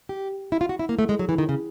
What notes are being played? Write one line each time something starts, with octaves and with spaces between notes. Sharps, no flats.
G4
E4
F4
F#4
E4
A#3
A3
G#3
F#3
E3
D#3
C#3